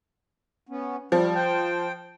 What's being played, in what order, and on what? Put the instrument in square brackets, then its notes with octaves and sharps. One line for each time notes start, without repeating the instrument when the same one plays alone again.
[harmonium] B3 C#4
[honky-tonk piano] F3 [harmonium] G3
[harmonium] C5 G5